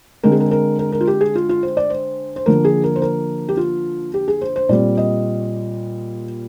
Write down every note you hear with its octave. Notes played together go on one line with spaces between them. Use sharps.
D3 G#3 C4 A#4
G#4
A#4
A#4
A#4
A#4
F4
G4
G#4
F4
F4
C5
D5
C5
C5
D3 F3 A#3 A#4
G#4
A#4
C5
A#4
G4
F4
G4
G#4
C5
C5
A#2 G3 C4 D5
D#5